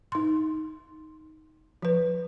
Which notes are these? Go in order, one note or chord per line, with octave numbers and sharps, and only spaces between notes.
D#4 C6
F3 B4